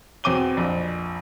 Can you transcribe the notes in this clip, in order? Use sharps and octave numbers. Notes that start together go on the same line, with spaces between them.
E2 B2 C4 D6 D#7 G7
A#1 F2